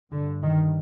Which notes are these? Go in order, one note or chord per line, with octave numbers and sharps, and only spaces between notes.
G2 D3
D#3